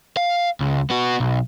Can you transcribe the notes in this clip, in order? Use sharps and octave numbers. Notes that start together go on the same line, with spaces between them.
F5
C#2
B3 F#4
B1